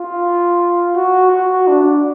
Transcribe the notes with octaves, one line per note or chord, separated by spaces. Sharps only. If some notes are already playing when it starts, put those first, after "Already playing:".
Already playing: F4
F#4
F#4
D4